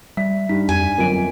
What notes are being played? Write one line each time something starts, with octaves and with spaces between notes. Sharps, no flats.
G3 E5 B6
G2 D#4 B6
F2 G#5
G1 F2 F#3 A#4 D7